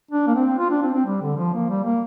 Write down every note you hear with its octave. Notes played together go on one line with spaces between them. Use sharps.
D4
A#3
C4
F4
D4
C4
C4
G3
D3
F3
A#3
G3
A#3